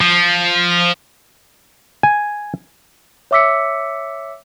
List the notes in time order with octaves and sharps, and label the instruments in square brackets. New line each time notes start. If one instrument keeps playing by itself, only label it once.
[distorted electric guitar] F3
[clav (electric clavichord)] G#5
[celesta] C#5 E5 D6 E6 B6 C#7